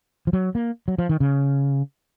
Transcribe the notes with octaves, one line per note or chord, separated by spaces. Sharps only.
F3
F#3
A#3
F#3
F3
D#3
C#3